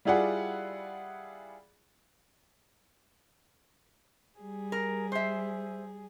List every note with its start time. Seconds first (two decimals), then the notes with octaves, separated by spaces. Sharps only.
0.05 G3 E4 F4 G#4 D5 F#5
4.39 G3 G#4
4.72 A#4
5.12 C5 E5